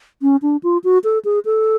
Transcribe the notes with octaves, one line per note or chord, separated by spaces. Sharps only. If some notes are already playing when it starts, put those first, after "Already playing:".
C#4
D4
F4
F#4
A4
G#4
A4